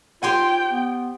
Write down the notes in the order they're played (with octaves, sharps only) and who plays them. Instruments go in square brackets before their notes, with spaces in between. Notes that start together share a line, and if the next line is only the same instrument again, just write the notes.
[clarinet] F4 [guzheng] G4 C5 G#5 [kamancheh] G5
[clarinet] B3